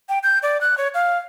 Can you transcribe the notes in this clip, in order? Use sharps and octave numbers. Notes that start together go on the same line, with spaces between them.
G5
G6
D5
F#6
C#5
F5